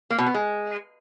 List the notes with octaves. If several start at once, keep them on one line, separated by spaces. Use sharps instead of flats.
A#3
B2
B3
G#3